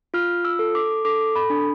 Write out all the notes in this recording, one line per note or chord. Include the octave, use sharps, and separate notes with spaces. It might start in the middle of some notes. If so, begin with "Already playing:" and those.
F4 F6
E6
A4
D6
A4 D6
B5
D4